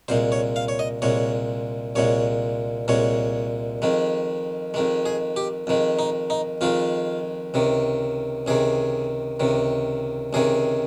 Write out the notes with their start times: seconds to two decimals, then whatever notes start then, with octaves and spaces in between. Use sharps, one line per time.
0.08 C2 A#2 G#3 C5
0.32 C#5
0.56 F5
0.68 C#5
0.79 D#5
1.02 C2 A#2 G#3 C#5
1.95 C2 A#2 G#3 C#5
2.88 C2 A#2 G#3 C#5
3.82 F2 D#3 G#3
4.74 F2 D#3 G#3
5.06 G#4
5.36 G4
5.67 F2 D#3 G#3
5.99 D#4
6.30 D#4
6.61 F2 D#3 G#3 F4
7.54 C#2 C3 D#3
8.46 C#2 C3 D#3 G#4
9.40 C#2 C3 D#3
10.33 C#2 C3 D#3 G#4